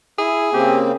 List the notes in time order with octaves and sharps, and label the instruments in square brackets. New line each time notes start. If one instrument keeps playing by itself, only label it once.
[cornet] E4 [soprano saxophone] G#4
[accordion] C#3 A#3 C4 [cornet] G4